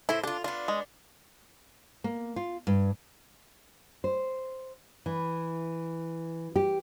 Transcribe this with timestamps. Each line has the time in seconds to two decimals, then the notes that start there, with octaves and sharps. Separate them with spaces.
0.09 A2 E4 C5
0.24 D4 F4 G4
0.44 B3 D4 F4
0.68 G#3
2.04 A#3
2.36 F4
2.67 G2
4.04 C5
5.06 E3
6.56 G4